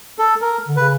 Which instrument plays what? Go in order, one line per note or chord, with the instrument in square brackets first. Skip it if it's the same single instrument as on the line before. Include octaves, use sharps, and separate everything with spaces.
[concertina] A4
A#4
[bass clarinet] D3
[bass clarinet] C#3 [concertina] B4